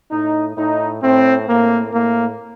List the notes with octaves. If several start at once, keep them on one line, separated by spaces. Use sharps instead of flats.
A2 D#4
A2 D#4
A2 C4
A2 A#3
A2 A#3